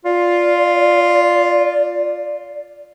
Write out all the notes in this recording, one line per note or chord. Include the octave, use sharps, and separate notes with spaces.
F4 D5